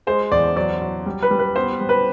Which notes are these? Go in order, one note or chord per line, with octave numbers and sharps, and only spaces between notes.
G#3 C5
E2 D5
F#3 D5
F#3
G3
B4
G3
B4
B3 C5
G3
B4